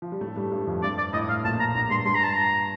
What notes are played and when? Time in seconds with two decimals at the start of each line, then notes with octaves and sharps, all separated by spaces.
0.02 F3
0.12 G3
0.21 A2 A3
0.36 G2 G3
0.51 G2 G3
0.67 F2 F3
0.83 G2 D5
0.98 D5
1.13 A2 D#5
1.28 A2 F5
1.44 A#1 A#2 A5
1.60 A#5
1.75 A#1 A#2 A#5
1.90 G2 C6
2.06 G2 C6
2.15 A#5
2.23 A5
2.33 A#5